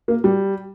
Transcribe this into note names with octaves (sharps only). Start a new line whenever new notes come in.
A#3
G3